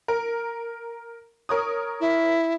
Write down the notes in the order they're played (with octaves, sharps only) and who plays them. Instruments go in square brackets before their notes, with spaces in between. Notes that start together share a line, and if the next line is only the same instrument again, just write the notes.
[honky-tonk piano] A#4
A#4 C#5 D#6
[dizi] E4